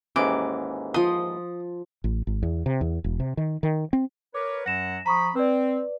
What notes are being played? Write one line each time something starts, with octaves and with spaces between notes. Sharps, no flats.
D#2 G#2 E3 C#4 D6
F3 C6 D#6
A1
G#1
E2
C3
E2
E1
C3
D#3
D#3
C4
A#4 B4 C#5 D6
F#2 F#3 F#5 A#6 E7
F3 A#5 B5 C#6 D#6
C4 B4 D5